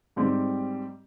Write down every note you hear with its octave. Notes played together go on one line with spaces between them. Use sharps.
G#2 G3 C4 G4